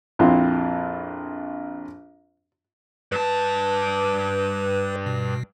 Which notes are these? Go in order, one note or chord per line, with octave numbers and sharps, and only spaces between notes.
A#1 F2 C4 E4 F4
G2 B4 A5
B2